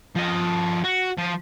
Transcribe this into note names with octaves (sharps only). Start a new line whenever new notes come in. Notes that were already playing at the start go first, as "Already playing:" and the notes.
F3 D#5
F#4
F3